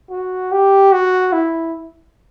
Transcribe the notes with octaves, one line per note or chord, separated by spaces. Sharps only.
F#4
G4
F#4
E4